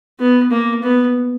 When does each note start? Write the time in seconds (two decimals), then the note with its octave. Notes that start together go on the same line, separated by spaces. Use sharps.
0.19 B3
0.51 A#3
0.83 B3